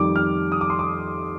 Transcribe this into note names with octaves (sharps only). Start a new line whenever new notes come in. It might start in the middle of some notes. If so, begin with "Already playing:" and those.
Already playing: F2 D#3 G3 D6
F6
D#6
D6
C6
D6